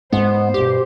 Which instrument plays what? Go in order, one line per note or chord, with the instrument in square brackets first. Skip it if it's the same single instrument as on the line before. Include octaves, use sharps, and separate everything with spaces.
[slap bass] G#2 G#3 [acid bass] B3 [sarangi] C5
[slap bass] G2 B2 [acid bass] G4